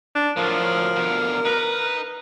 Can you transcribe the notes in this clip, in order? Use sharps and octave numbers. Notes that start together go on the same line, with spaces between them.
D4
A2 F3 F#3 A#4
B2 D3
D#4 B4 A#5